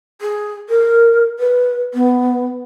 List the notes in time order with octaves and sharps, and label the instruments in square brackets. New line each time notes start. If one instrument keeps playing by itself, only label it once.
[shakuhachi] G#4
A#4
B4
B3